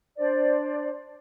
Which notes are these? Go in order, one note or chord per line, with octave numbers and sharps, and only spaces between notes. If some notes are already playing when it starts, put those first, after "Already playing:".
D4 C5 D5